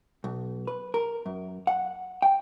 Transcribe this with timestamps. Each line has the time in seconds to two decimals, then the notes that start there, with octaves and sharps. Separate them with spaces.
0.24 B1
0.67 B4
0.94 A#4
1.26 F#2
1.67 F#5
2.22 G5